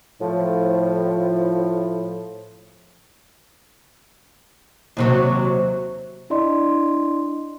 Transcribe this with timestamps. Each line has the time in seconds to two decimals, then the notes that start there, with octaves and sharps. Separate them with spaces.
0.21 A2 F3
4.97 D#2 C3 F#3
6.30 D4 E4 D5 D#5 C6